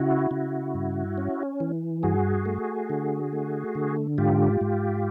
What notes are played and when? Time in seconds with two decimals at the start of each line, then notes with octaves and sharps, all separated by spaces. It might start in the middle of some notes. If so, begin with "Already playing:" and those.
Already playing: C#3 E4 F#4
0.31 C#3
0.74 G2
1.18 C#4
1.60 E3
2.03 G2 F#4 G#4
2.46 A3
2.89 D3
3.33 A3
3.75 D3
4.18 G#2 F4 G4
4.61 G#2